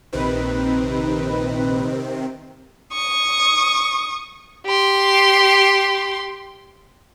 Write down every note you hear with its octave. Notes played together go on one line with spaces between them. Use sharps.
A#1 C3 D#3 C4 D#4 B4
C#6 D#6
G4 C6